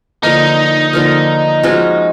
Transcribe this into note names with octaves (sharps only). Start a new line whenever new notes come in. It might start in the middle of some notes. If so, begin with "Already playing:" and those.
D3 F3 A#3 D#4
D3 F3 A#3
F3 G#3 C#4 F#4